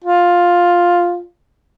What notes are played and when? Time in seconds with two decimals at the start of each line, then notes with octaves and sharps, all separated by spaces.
0.04 F4